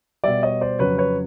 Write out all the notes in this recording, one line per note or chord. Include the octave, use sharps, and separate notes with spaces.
B2 G3 D5 E5
C#5 D#5
C5 D5
F2 C#3 F#3 B4 C#5
B4 C#5